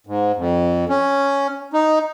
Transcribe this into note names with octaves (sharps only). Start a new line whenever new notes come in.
G#2
F2
C#4
D#4